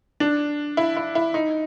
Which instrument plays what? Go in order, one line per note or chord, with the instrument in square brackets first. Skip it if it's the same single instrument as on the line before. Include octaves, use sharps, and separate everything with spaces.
[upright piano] D4
E4
E4
E4
D#4